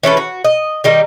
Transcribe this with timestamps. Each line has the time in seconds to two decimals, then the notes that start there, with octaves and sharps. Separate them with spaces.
0.03 E3 C#4 A4 B4
0.17 F#4
0.44 D#5
0.84 D#3 G3 D#4